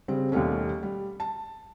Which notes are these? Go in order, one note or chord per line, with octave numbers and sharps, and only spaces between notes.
C#3 G3 C4
D#2 B2 G3 A3 C#4
G3
A5